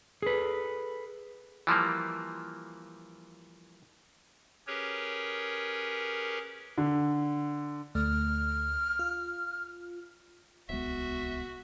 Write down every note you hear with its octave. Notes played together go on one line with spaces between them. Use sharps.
G#4 A4 B4
E3 F3 G3 A#3
C#4 G4 G#4 A#4 B4 C#5
D3
D2 A3 F6
F4
D1 C2 G#3 B3 F#4 E5